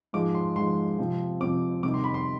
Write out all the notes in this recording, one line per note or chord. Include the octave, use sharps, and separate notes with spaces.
G#2 F3 G#3 D6
C6
G#2 F3 G#3 C6
C3 F3 C4
C3 F3 C4 D6
C3 D#3 G3 D6
C6
B5
C6